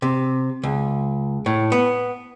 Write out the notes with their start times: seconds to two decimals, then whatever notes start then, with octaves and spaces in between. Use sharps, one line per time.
0.02 C3
0.64 C#2
1.46 A2
1.72 B3